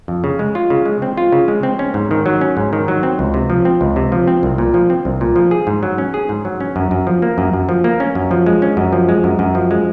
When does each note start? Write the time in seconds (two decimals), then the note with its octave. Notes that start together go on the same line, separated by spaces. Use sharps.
0.08 F2
0.24 C#3
0.39 G#3
0.55 F4
0.70 C#3
0.86 G#3
1.02 C4
1.17 F4
1.32 C#3
1.48 G#3
1.63 C4
1.79 C#4
1.94 G#2
2.11 D#3
2.26 F#3
2.41 C#4
2.57 G#2
2.73 D#3
2.88 F#3
3.03 C4
3.19 C#2
3.34 C3
3.50 F3
3.65 C4
3.81 C#2
3.96 C3
4.12 F3
4.28 C4
4.43 C2
4.58 A#2
4.74 F3
4.90 C4
5.05 C2
5.21 A#2
5.36 F3
5.51 G#4
5.67 G#2
5.83 F#3
5.98 C#4
6.14 G#4
6.29 G#2
6.45 F#3
6.60 C#4
6.76 F#2
6.91 F#2
7.07 F3
7.22 A#3
7.38 F#2
7.53 F#2
7.69 F3
7.84 A#3
8.00 C#4
8.15 F#2
8.31 F3
8.46 G#3
8.62 C#4
8.77 F#2
8.93 F3
9.09 G#3
9.24 F#2
9.39 F#2
9.55 F3
9.71 G#3